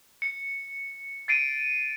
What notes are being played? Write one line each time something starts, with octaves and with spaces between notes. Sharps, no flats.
C#7
A6 C7 D7 D#7